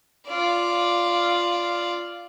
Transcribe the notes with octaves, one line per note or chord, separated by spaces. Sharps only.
F4 D5